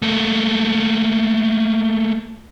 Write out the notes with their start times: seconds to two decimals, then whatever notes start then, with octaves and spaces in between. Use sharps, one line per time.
0.02 A3 A#3